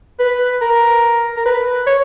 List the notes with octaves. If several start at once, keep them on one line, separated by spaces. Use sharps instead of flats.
B4
A#4
A#4
B4
C#5